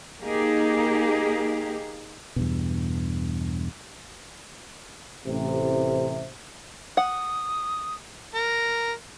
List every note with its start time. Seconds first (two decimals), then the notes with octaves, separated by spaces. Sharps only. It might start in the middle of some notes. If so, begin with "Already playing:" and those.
0.22 A#3 D#4 G4 G#4
2.36 E2 G2 B2
5.25 A1 C3
6.97 F#5 D#6
8.35 A#4